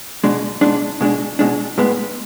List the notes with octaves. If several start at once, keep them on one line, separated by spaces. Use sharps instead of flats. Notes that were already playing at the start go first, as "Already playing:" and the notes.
B2 G#3 D4
B2 G#3 D4
B2 G#3 D4
B2 G#3 D4
A2 G#3 B3